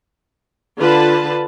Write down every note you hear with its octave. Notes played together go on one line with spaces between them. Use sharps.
D3 F4 B4 A5